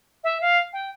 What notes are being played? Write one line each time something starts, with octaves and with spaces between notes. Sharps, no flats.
E5
F5
G5